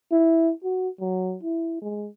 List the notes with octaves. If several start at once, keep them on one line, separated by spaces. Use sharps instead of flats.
E4
F#4
F#3
E4
G#3